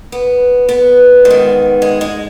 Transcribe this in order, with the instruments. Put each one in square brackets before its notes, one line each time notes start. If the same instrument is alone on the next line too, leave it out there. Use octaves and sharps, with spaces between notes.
[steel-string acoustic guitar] B3
B3
G#2
D#3
G#3
G#3